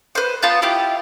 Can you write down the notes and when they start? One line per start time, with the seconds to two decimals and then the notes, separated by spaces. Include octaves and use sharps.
0.15 B4 C5
0.42 B3 F4 A5 G6
0.62 E4 F4 G4